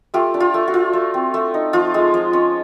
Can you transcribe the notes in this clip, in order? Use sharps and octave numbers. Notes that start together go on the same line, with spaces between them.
A3 F4 G4
D4
F4
A3
F#4
F4
A3
C4
A3
D#4
F3 F4
G#3
F3
C#4